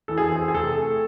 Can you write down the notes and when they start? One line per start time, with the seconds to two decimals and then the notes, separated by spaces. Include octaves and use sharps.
0.08 E3 A4
0.18 G#4
0.31 C4 G#4
0.48 G#4
0.54 C3 A4
0.78 A3